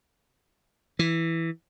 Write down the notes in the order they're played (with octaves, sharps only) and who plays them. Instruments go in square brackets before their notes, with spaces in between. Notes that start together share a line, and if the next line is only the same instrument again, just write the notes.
[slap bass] E3